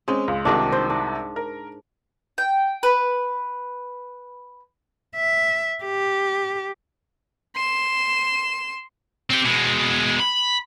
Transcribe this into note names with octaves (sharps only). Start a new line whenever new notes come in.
G#3 C4 C#4
C#2
C2 G#2 C3 D#3 D4 F#4
C5
D4
A#4
G5
B4
E5
G4
C6 E7
C4 G4
B2 G#3
B5